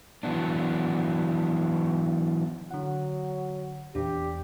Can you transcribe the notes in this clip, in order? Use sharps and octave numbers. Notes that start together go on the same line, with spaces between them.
E3 F#3 B3 D4
D3 F#3 F#5
E2 A#2 D4 G4